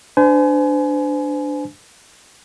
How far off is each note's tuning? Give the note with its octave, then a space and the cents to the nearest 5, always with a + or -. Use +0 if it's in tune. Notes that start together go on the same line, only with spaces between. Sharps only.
D4 +0 C5 -40 G#5 +25